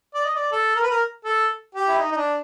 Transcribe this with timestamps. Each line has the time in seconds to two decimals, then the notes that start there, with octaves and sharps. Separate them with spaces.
0.15 D5
0.25 D#5
0.35 D5
0.52 A4
0.76 A#4
0.83 B4
0.91 A#4
1.24 A4
1.75 G4
1.88 E4
1.99 D#4
2.12 D#4
2.18 D4